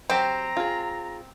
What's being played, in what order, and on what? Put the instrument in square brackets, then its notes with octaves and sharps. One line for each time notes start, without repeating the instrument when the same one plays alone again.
[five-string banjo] F#3 G4 [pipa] C4 [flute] A#5
[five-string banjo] F4 G#4